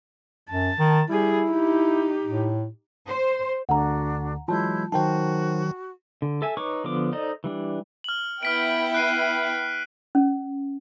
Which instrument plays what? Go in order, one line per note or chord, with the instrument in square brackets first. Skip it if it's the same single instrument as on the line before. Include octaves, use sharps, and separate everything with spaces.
[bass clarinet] F#2 [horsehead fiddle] A5
[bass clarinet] D#3
[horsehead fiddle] G3 G#4 [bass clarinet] E4
[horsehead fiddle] D#4 G4
[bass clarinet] A2
[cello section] C5
[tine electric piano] D2 D3 [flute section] D4 F#4 [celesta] F#5 A#5
[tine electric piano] E3 F#3 G#3 [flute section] E4 C6 G6 [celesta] F4 A5
[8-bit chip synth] D#3 F#3 [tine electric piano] D#4 A#4 C5 [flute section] F#4 [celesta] G5 A5
[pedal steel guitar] D3
A4 E5 G#5
D#4 B4 C#5 C#6 D6
D3 F3 B3 D6
D#4 A4 C5 D5 D#5
E3 G3 D4
[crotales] F6 F#7
[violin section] B3 E4 G5 [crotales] F6 B6 D7
[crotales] F#6 C7 D#7
[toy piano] C#4